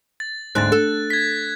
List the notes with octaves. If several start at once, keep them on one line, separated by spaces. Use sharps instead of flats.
A6
D2 G#2 C4 F#6 A6
A4
G#6 B6